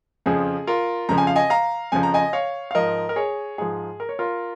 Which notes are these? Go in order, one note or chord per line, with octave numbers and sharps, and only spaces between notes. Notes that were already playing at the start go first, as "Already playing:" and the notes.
F2 C#3 F3 G#4
F4 A#4
F2 C#3 F3 A#5
G#5
F5
D#5 G#5
F5 A#5
F2 C#3 F3 G#5
A#5
D#5 G#5
C#5 F5
F5
G#2 F3 A#4 D#5
A#4
G#4 C#5
G#2 F3 G#4
A#4
C#5
F4 A#4